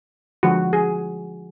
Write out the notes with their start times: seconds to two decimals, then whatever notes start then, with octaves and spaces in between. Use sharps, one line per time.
0.43 D3 F3 G#3 F#4
0.73 G#4